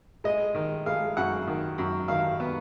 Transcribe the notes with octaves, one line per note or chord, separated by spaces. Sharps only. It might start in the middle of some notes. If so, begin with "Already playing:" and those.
G#3 D#5
D#3
G#3 F5
F#2 F#5
D#3
F#2
D#3 F5
B3